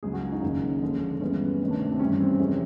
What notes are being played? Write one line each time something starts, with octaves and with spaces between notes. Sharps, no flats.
C#2 C#3 F#3 G#4
F#4
F4
D#4
F#1 F#2 D#3 C#4
D#2 D3 F3 G#3
G2 E3 G#3 B3 C#4
D2 C3 D#3
D4
C4
C4
G2 E3 G3 C#4
C#4
C4
C#4
F2 C3 E3 G#3